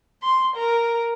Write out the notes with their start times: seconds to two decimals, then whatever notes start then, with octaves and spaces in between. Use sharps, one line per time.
0.23 C6
0.56 A#4